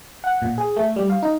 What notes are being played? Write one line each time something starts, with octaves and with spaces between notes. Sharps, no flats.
F#5
A#2
G#4
A3
G3
F5
D#4